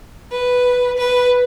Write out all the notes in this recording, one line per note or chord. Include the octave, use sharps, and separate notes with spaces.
B4
B4